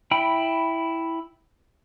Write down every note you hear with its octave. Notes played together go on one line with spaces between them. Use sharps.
E4 G5 B5